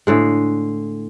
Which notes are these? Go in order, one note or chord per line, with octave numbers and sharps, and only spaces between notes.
A2 D3 G#3